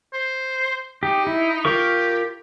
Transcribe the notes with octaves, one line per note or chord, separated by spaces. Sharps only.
C5
D#4 G4
E4
F4 G4 A#4 C#6